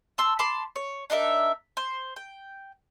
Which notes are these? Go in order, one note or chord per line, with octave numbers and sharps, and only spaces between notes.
A5 C6 E6
A5 B5 C6 D6
C#5
D4 D#4 A#4 E5
C5
G5